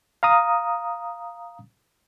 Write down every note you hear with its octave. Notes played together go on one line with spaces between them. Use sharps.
F5 A#5 D#6